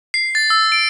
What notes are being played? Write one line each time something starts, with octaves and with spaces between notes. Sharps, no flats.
C7
A6
E6
D7